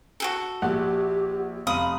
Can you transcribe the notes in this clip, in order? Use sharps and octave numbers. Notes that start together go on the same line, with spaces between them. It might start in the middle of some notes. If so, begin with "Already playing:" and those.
F#4 G#4 A4
A#1 G4 F#5
F1 F5 B5 D#6 D#7